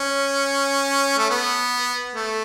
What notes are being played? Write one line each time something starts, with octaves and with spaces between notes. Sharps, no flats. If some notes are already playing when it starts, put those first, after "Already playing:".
Already playing: C#4
A3
B3
A3